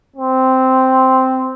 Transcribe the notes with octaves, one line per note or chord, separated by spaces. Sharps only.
C4